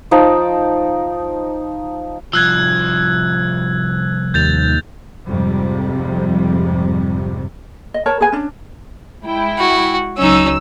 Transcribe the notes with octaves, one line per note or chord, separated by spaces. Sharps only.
F3 D#4 G5 A5
C2 F3 E6 F#6 G#6
D#2 G6 A6 F7
F2 G#2 C3 G3
D#5
A#4 C#5 A5
G#4 B4 G#5
C#4 D4
G#3 E4 G5
F#4
C#2 F#3 C#4 D#4 E6